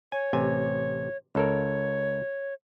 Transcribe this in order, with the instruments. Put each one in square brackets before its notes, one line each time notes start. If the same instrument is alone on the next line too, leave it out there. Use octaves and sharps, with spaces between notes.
[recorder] C#5 [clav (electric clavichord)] G#5
[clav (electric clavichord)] A1 C3 G#5
[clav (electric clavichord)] C#2 A4 A#4 [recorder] C#5